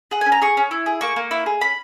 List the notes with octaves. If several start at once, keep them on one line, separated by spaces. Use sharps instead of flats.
G#4 F#5
G#5
C#4
A#5
G#4 C#6
C#4
E4
G#4
A#3 C#6
A#3
E4
G#4
C#4 B5